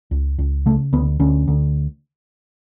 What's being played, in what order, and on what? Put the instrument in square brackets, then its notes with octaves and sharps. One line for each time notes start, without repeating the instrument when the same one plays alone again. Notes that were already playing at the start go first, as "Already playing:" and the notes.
[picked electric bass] C#2
C#2
C#3 A3
D2 B3
D2 C#4
D2